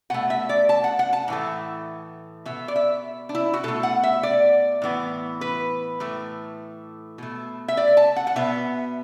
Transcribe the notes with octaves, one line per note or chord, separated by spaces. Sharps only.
B2 A3 F#5
E5
D5
A5
F#5
F#5
A5
A2 E3 A3
B2 B3 E5
D5
E5
D4
E4
F#4
B2 A3 A4
F#5
E5
D5
A2 E3 B3
B4
A2 E3 A3
B2 A3
E5
D5
A5
F#5
F#5
B2 B3 E5